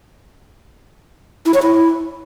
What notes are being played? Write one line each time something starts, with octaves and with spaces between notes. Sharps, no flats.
E4
C#5
E4